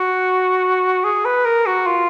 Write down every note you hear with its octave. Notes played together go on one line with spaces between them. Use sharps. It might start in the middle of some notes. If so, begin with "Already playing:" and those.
Already playing: F#4
G#4
B4
A#4
F#4
F4